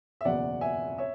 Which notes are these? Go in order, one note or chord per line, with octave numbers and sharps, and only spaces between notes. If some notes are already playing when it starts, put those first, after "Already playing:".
E5
F#1 E2 B2 D5 F#5
E5 G#5
C#5 E5